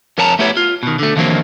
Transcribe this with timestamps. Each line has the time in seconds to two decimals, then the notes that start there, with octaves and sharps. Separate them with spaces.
0.18 F2 A#4 C#5 A5 A#5
0.39 A3 B3 E4 G4 C#5
0.57 F4
0.83 B2 D#3
0.99 D3 A3
1.16 D#2 D3 E3 F#3 A#3 C4